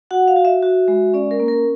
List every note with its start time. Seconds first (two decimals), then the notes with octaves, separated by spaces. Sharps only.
0.11 F#4 F#5
0.28 F5
0.36 F#4
0.45 E5
0.63 F#4
0.88 G#3
1.14 C#4 D5
1.31 A#4
1.40 A#3
1.48 A#4